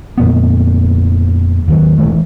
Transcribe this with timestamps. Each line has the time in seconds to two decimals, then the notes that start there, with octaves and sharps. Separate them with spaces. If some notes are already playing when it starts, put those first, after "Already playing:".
0.18 F2 A#2 B3
1.67 D#2 F#3
1.98 E1 E3 A3